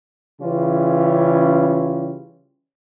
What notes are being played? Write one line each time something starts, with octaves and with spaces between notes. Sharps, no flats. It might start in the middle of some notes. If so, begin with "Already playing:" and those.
C#3 E3 G3 C#4 F4